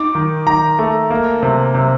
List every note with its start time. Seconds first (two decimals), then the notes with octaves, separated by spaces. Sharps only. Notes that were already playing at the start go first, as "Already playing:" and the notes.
Already playing: D#4 D6
0.15 D#3
0.47 D#3 A#5
0.79 A3
1.10 A#3
1.43 C3
1.75 C3